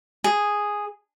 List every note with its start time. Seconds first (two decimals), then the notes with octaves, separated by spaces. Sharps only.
0.24 G#4